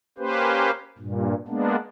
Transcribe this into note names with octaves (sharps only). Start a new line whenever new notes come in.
A#3 C#4 G4 B4 C5
G2 A#2
G#3 A#3 B3 D4